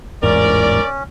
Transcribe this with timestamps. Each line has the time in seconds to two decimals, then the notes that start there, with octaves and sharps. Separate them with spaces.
0.23 A1 E2 G#2 C#4 A#4 D5